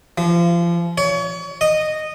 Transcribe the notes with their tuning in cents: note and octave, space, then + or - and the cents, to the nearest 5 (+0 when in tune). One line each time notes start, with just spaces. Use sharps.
F3 -30
C#5 +35
D#5 -10